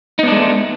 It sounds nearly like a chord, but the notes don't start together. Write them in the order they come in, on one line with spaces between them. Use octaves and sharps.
D#4 B3 D4 G#3 A3